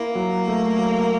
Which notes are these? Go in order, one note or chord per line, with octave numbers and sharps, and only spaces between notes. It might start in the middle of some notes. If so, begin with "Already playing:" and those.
Already playing: A#3 E4
F#3
A3
F#3